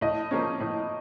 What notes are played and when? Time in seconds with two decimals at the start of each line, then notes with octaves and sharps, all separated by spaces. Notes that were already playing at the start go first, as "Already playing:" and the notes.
0.01 A2 D#5
0.31 F3 A#3 C#4
0.60 A2